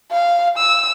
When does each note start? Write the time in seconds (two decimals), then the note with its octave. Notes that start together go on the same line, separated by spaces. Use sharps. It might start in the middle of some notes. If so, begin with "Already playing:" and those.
0.11 F5
0.58 E6